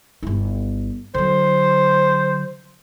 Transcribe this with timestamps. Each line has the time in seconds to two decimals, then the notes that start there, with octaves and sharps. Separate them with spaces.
0.23 G1 E4
1.14 D3 F#3 C5